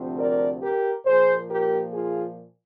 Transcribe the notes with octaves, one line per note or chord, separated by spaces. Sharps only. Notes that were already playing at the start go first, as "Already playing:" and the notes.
Already playing: D2 C3 F3 C4
A#4 D5
G4 A#4
A#2 F3 A#3 G#4 C5
G4 A#4
F4 G#4